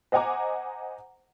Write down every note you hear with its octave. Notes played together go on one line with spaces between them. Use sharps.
C5 D#5 F#5 G#5 A#5 D6